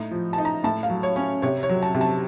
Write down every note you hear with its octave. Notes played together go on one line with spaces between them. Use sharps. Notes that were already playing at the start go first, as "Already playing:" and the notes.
Already playing: A2 D#4
F3
A5
D#4
A#5
A2 A5
F5
F#3
C#5
C#4
C3 C#5
C#5
F#3
A5
C3
A5